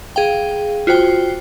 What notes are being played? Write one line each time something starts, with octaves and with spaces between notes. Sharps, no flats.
G#4 F5 G5
F4 F#4 C5 G5